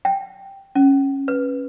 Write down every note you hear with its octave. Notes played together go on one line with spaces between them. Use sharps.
G5
C#4
B4